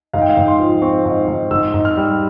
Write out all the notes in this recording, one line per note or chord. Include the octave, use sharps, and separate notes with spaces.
G#2 F5
G5
F5
G#2
C6
F3
C4 C#6
G#2
G#2
G#2 E6
G#2
F6
G3